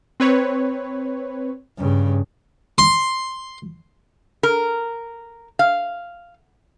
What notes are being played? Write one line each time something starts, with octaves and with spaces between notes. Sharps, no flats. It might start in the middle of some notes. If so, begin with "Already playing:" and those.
C4 B4 C#5
G2 C#3
C6
A#4
F5